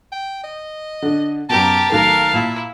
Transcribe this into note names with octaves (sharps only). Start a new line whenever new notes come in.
G5
D#5
D3 D4
F#2 B2 G4 A#4 A5
B1 D#3 A3 A#4 F5
A#2 E4